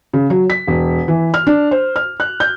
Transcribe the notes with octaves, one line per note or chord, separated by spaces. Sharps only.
C#3
F#3
B6
E1
E3
F6
D4
C5
F6
F#6
G6